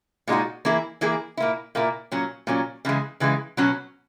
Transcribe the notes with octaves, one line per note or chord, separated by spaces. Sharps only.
A#2 G#3 D#4 F#4
E3 A#3 E4 G#4
E3 A#3 E4 G#4
A#2 A#3 E4
A#2 A#3 E4
A#2 F#3 C#4
A#2 F#3 C#4
C#3 E3 G#3
C#3 E3 G#3
B2 F#3 C#4 F#4